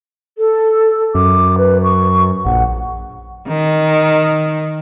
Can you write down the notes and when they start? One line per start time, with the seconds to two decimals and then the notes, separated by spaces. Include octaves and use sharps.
0.38 A4
1.15 F#2 D6
1.58 B4
1.84 C#6
2.45 A#1 F#5
3.48 D#3